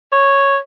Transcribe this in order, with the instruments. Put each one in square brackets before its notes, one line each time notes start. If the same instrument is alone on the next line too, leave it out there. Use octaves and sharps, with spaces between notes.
[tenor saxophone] C#5